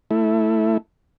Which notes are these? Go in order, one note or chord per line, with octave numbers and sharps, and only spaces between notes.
A3 E4